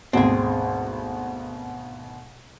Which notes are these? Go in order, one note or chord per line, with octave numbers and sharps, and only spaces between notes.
G#1 D2 B2 C4 G#4